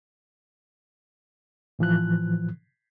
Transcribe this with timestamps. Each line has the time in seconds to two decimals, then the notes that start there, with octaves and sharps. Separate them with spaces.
1.79 A2 E3 F3 F#6